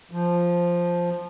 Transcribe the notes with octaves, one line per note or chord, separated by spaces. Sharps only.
F3